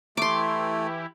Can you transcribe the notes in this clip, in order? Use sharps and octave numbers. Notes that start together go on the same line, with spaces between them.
E3 A3 E4 G4 C6 D6